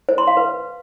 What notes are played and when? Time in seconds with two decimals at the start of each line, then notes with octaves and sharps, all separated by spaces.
0.09 C5
0.18 C6
0.27 F5
0.37 B4